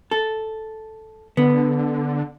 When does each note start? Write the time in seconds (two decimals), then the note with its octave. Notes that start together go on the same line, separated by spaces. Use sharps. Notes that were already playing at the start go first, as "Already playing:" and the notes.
0.11 A4
1.37 D3 B3